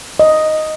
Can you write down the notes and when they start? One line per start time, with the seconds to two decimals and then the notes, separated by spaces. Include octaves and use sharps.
0.20 D#5